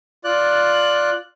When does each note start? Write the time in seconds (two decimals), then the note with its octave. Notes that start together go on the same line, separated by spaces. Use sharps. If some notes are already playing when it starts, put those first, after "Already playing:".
0.24 F4 D5 F#6